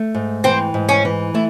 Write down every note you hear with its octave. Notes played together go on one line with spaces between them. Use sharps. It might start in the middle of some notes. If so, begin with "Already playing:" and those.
Already playing: A3
G#2
E3 C4
G#2
C#4
E3
A3 E4